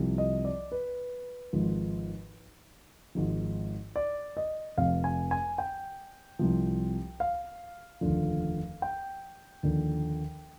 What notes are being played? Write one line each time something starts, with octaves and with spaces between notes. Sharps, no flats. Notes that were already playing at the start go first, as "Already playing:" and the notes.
Already playing: C2 C3 F3
D#5
D5
B4
G#1 G#2 F3
G#1 G#2 F3
D5
D#5
F1 F2 C3 F5
G#5
G#5
G5
C2 C3 F3
F5
F1 D#2 D3 F3
G5
D#2 D3 F3